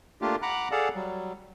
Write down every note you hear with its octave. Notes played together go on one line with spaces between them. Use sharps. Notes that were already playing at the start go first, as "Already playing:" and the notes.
A3 A#3 D4 F4 G4
F#5 A#5 B5 D6 F#6
G#4 A4 D5 F5 F#5 A5
F#3 G3